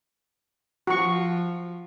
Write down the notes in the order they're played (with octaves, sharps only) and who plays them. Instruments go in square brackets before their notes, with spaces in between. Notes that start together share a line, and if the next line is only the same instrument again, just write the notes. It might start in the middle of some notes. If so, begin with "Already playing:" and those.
[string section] F3 [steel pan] F#4 C#6